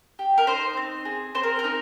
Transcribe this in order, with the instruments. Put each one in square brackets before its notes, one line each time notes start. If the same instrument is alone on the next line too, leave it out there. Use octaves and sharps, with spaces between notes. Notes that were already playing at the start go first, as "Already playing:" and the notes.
[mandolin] G4
A#4
D#4 C5
C4
G#4
C4 C5
A#4
A#4
D#4